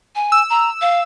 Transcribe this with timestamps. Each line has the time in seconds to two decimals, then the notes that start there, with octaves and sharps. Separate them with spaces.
0.16 G#5
0.32 E6
0.50 A#5
0.81 F5